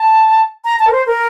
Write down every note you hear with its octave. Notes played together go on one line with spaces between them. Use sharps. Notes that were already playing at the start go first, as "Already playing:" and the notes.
Already playing: A5
A#5
A5
A#4
C5
A#4